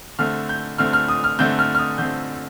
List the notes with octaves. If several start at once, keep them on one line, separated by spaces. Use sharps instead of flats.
D3 A3 C4 F6
G6
D3 A3 C4 F6
F6
D#6
F6
D3 A3 C4 G6
F6
F6
D#6
D3 A3 C4 G6